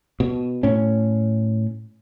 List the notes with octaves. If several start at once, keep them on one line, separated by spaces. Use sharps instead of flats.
B2
A2 C#4